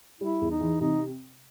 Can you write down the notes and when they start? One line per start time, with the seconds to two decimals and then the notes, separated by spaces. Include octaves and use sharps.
0.21 G3 E4
0.41 E2
0.51 D#4
0.61 E3
0.81 C3 D#4